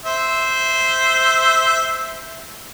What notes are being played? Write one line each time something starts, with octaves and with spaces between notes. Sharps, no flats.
C5 E5